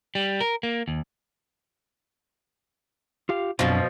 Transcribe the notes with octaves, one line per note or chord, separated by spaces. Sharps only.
G3
A#4
A#3
D#2
F4 G4 F5
F#2 B2 F3 C4 D4